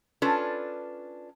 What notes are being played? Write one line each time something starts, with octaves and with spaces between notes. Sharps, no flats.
C#4 D4 F4 A4 B4